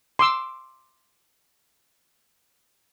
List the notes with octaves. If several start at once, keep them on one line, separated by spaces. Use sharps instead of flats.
C6 D6 E6